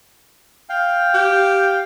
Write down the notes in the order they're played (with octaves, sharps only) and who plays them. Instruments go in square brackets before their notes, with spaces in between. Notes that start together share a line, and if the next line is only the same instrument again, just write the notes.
[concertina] F5 G5
[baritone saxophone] G4